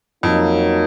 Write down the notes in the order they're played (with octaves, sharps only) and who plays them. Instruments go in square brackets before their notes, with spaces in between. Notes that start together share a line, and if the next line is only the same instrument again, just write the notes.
[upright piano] F2 [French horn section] F#3 A#3 D#4